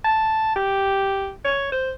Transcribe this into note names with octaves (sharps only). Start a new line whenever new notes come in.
A5
G4
C#5
C5